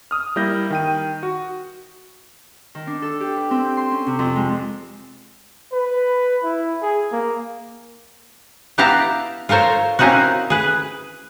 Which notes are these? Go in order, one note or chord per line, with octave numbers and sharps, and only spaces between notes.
D#6 F6
G3 A#3 E4 G6 A#6
D#3 G5 D#7
F#4
D#3
D4
A4
G4
B4
C4
G6
C6
C#4
C3
F2
G#3
B4
E4
G#4
A#3
B3 E4 G4 F5 A5 A#5
F4 A4 A#4 C5 C#5
A#3 C4 C#4 D#4 E4 F#4
G#4 B4